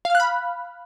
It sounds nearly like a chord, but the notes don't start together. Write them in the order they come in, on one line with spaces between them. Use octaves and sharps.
F5 F6 F#6 B5